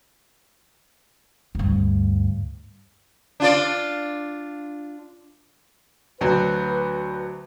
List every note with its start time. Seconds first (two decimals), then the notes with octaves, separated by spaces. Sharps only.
1.55 D2 G2
3.40 D4 F4 D5
6.21 D2 F#3 B4